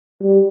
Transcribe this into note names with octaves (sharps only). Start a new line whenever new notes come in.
G3